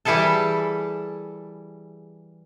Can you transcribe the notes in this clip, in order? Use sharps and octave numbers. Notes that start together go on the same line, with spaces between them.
E3 G3 E4 G#4 A4 A5